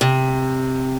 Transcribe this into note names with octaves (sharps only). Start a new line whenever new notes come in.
C3